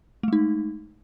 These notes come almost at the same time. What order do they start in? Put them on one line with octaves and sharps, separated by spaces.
A3 G#3 D#4